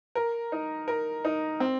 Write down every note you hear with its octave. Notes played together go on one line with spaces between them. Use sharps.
A#4
D#4
A#4
D#4
C4